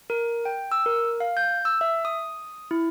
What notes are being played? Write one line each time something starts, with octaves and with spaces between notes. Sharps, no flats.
A#4
G5
E6
A#4
F5
G6
E6
E5
D#6
E4